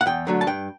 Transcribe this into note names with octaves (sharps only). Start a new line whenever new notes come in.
F#5
E2 G5
D3 F#3 A3
A5
G2 G5